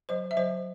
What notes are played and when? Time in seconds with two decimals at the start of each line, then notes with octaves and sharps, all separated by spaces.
0.09 F#3 C5 D#5
0.31 E5
0.37 F#3 C5 D#5